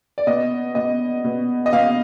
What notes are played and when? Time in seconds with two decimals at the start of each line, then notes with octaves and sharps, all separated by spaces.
0.18 D5
0.27 B2 D#5
0.75 B2 D#5
1.24 B2
1.66 D#5
1.72 B2 F5